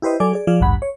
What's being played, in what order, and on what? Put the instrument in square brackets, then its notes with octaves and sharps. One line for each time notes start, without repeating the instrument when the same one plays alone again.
[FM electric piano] E4 G4 B4 C5 D#5
F#3 A4 D5 G#5 D6
G#4 D5
F3 G#4 D5 F5
A1 D2 G2 F#5 B5
C#5